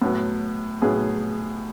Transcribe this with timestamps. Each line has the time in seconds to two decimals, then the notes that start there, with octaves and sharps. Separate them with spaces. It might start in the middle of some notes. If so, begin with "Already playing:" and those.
0.02 A2 F#3 B3
0.82 A2 F#3 B3 G#4